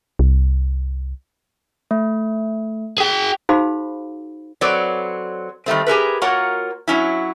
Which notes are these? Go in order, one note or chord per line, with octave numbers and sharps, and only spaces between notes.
C2
A3
G#4 G5
D#4 F#4 G#4 C5 F5 B5
F#3 C4 A4 B4 C#5 D5
D#3 G3 A3 C4
G4 G#4 A#4 B4
A#3 F4 F#4 A#4 C#5 F#5
F#3 C#4 E4